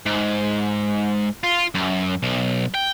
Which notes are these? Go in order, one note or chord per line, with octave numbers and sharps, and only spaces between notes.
G#2
F4
F#2
B1
G5